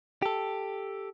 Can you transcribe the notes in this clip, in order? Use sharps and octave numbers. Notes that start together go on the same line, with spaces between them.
G4 A4